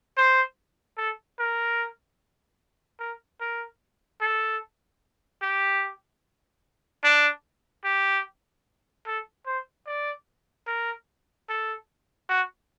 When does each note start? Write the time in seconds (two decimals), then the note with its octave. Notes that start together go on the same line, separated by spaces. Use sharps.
0.17 C5
0.98 A4
1.39 A#4
3.00 A#4
3.41 A#4
4.21 A4
5.42 G4
7.04 D4
7.84 G4
9.06 A4
9.46 C5
9.87 D5
10.67 A#4
11.49 A4
12.29 F#4